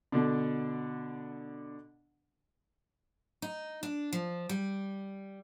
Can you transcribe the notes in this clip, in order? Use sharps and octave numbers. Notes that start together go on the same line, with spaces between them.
B2 D3 D4
D#4
D4
F3
G3